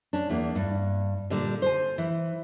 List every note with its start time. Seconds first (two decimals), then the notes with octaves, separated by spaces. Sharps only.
0.13 C#4 D4
0.29 E2 A#3
0.55 G2
1.30 A#2 D3 G3
1.62 C5 G#5
1.98 E3